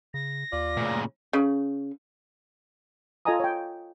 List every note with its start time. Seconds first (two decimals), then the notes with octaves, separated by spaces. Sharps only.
0.14 C#3 A#6
0.53 D#2 F4 D5
0.77 A#2 C#3 A3
1.33 C#3
3.25 F4 A4 D#5 G#5 A#5 D#6
3.40 C#5 G5